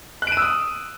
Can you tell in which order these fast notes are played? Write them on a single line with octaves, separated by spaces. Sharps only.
F#6 D7 D#7 E6 D#6